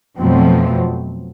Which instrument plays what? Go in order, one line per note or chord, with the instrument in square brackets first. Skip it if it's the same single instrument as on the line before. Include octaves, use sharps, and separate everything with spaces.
[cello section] F2 F3 [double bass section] B2 F#3 A3 C4